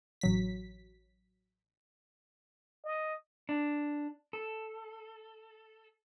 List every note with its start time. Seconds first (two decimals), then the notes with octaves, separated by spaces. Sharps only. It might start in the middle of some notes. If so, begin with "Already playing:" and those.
0.21 A1 F#3 B6
2.84 D#5
3.49 D4
4.33 A4